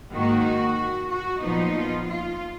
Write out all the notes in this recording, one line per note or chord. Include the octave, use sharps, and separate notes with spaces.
G#2 D#3 A#3 D#4 F#4
F#4
A#2 F3 B3 D#4
F4
F4